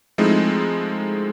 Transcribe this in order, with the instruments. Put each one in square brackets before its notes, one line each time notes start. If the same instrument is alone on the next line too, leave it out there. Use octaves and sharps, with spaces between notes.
[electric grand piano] F3 G#3 A3 C4 D#4 E4